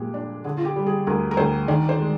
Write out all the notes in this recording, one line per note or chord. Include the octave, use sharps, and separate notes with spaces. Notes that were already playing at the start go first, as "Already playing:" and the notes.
Already playing: A#2 F3 G#3 G4
D4
D3 G#4
F4
G4
G3
G#4
D2 A#4
A#4
D2 C5
D#3 D5
C5
G#3